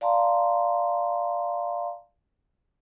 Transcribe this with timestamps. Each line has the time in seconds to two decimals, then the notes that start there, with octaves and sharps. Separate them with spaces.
0.01 D5 F5 A5 A#5 C6